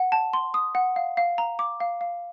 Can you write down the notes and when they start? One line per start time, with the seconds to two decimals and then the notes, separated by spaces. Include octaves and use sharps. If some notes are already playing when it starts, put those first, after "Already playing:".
Already playing: F#5
0.12 A5
0.33 C6
0.54 D#6
0.75 F#5
0.96 F5
1.17 F5
1.38 A#5
1.59 D6
1.80 F5
2.01 F5